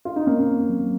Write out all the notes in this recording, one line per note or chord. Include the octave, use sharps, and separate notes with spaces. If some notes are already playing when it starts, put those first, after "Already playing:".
F4
D#4
A#3 C4 C#4
F#3